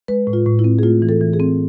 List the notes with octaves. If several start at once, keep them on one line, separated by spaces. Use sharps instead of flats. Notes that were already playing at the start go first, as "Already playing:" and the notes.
G#3 B4
A2
F4
A2
E4
C4
G#4
A3 F4
E3
A4
E3
G#4
C4